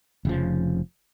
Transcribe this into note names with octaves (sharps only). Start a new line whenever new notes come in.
F1 C#3 F3